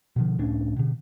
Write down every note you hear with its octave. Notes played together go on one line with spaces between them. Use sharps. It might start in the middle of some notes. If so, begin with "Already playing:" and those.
B2 D3 F3
C#2 A2 C#4 D4
B2 D3